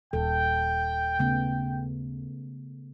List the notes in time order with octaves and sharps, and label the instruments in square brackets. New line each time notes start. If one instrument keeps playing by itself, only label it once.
[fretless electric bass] D#1 [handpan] A4 [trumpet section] G5
[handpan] C#3 A3 B3